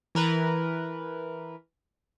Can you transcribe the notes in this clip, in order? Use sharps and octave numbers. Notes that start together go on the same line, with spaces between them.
E3 A#4 B4